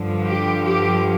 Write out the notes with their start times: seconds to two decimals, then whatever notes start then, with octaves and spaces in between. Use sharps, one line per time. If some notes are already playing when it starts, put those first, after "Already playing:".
Already playing: G2 D3 F3
0.25 G4
0.63 G4